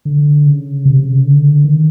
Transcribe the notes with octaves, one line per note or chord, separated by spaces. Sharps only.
D3
C#3
C3
C#3
D3
D#3